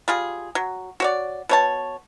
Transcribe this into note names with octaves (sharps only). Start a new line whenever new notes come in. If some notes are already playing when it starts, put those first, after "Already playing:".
G3 F4 G#4
F#3
F#4 C#5 D5
B2 C#5 A5